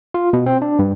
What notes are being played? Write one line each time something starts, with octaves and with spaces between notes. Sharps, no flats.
F4
B2
C4
D4
G2